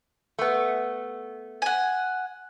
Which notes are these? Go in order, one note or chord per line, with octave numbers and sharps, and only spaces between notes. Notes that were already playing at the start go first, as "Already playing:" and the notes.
A3 B3
F#5 G#5